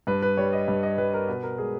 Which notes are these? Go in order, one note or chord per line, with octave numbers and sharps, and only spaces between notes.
G2 B4
B4
G3 C#5
D#5
G2
D#5
G3 B4
A#4
B2 B4
A#4
G#3 G#4